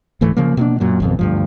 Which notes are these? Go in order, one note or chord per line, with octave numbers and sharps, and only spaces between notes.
D1 G#2 E3 A3
C#3 F3 A#3
B2 A#3 C#4 D4
F#2 A#2 F#3
G#1 F2 B2
D2 G2 F3